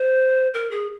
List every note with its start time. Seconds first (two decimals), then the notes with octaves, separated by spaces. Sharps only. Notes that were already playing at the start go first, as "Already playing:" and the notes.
Already playing: C5
0.54 A#4
0.71 G#4